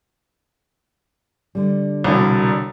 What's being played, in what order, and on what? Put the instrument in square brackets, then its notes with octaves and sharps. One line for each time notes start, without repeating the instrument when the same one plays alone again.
[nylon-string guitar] D3 G3
[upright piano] E1 C2